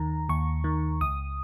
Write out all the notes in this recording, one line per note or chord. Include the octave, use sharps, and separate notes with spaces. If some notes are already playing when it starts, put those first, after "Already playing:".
Already playing: D#2 D#3 A#5
D#2 C#6
D#3
C#2 D#6